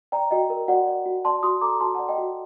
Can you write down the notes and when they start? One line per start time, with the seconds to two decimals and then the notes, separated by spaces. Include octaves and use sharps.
0.12 D5 G5 A#5
0.31 F#4 D#5 G5
0.50 A#4
0.68 F#4 D5 F#5
0.87 D5
1.06 F#4
1.25 D5 A5 C6
1.43 F#4 C6 D#6
1.61 A4 A#5 D6
1.80 F#4 A5 C6
1.95 F#5 A5
1.99 D5
2.08 D#5 G5
2.18 F#4